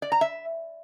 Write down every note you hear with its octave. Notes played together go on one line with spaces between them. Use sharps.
D5
A#5
E5